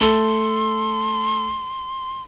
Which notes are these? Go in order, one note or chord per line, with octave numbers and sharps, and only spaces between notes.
A3 A4 C6